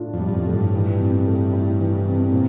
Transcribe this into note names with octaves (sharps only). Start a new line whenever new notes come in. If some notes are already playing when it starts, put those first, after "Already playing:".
Already playing: A2 D4 F4
F2
G3
G2
F2
A2
G2
E3
C3
A3
E4
E3
C3
A#2 C4